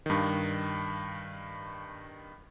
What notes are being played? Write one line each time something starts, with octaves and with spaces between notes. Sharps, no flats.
G2 D#3